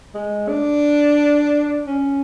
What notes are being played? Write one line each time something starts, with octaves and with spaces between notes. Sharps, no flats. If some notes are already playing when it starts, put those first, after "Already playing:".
G#3
D4
C#4